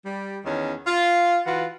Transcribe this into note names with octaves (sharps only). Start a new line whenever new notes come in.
G3
E2 D#3 C#4
F4
E3 F4 F#4